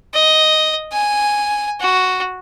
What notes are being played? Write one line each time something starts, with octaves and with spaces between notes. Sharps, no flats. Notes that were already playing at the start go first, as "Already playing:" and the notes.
D#5
G#5
F#4